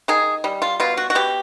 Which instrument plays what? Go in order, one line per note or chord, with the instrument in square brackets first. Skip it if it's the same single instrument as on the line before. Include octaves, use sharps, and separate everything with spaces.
[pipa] D#3 G#4
G3
F4
B2 F4
F#4
F#4
B2 G4